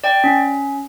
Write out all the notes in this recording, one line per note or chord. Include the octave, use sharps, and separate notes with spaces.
D5 G5
C#4